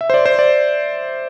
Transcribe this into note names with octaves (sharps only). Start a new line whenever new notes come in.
E5
C5
D5
C5
D5